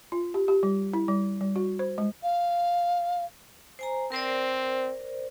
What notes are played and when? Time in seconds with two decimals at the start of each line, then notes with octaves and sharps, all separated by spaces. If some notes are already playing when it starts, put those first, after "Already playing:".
0.12 F4
0.34 G4
0.48 G4
0.63 G3
0.94 E4
1.08 G3
1.41 G3
1.56 F#4
1.79 C5
1.98 G#3
2.23 F5
3.79 C5 G#5 A#5
4.12 C4 A#4 C5 D5